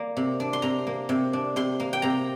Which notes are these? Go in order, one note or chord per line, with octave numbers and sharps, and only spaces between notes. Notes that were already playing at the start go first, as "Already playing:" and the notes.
Already playing: A#3 D5
C3
D4
C6
C3 A#5
A#3
C3
D4
C3 C6
A#3
G5
C3 A#5